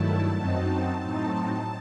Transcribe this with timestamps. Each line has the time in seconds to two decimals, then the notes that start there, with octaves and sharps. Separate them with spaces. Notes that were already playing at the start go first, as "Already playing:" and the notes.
Already playing: G2 D#3 F#3 A3 E4 A5
0.38 F#2 F#3 C4 D#4
1.01 A2 F#3 C4 D#4